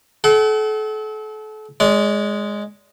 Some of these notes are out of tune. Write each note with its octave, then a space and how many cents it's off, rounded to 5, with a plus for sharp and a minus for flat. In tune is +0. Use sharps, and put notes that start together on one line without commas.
A4 -35 F#5 +40
G#3 +0 D5 -40